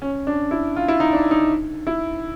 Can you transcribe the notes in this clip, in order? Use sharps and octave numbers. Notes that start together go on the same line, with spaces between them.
C#4
D4
E4
F4
E4
D#4
D4
D#4
E4